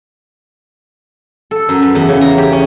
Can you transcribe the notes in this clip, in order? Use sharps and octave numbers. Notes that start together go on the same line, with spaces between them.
A4
F#2
B4
E2
C#3
A#5
G4
C#4